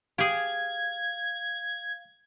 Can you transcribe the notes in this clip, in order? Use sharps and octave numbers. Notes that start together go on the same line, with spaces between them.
G4 G#4 F5 G#6